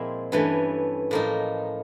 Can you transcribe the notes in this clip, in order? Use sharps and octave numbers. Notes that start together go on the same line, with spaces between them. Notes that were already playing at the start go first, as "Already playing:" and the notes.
Already playing: A#2 F3 G#3 C4 E4
G2 E3 A3 C#4
A2 F3 A#3 D#4